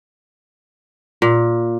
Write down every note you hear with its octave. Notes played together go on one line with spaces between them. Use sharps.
A#2